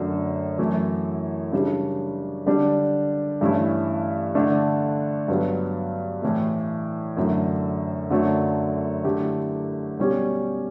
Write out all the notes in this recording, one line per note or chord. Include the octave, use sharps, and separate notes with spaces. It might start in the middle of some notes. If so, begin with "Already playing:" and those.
Already playing: F#2 D3 A3 D4
F#2 E3 A3 E4
C#3 G3 D4 G4
D3 G3 D4 G4
G2 E3 A3 C#4 E4
D3 A3 D4
G2 F#3 B3
A2 E3 A3
F#2 D3 A3
F#2 D3 F#3 A3
D3 A3 E4 G4
B2 G3 C#4 G4